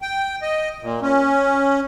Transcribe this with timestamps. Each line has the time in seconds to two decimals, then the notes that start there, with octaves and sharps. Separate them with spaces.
0.02 G5
0.42 D#5
0.82 A#2
1.02 C#4